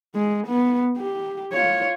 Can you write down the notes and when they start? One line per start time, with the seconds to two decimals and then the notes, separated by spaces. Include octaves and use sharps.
0.15 G#3
0.47 B3
0.97 G4
1.53 F4 C#5